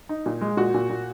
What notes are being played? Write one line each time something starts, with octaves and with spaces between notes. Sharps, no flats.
D#4
A#2
G#3
A#2 F#4
A#2
A#2